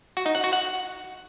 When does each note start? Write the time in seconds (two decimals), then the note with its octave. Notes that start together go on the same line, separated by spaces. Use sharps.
0.17 F#4
0.26 D#4
0.35 F#5
0.44 F#4
0.53 F#5